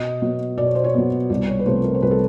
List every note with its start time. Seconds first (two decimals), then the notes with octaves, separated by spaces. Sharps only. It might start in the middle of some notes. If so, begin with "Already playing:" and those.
Already playing: B2 D#5
0.22 F#3 B3
0.58 B2 D5
0.66 C#5
0.75 C5
0.84 C#5
0.94 F#3 B3
1.30 C2 D5
1.48 C#5
1.59 B4
1.66 C3 F3 A3 C5
1.84 A#4
1.94 C5
2.02 C2 B4
2.11 A4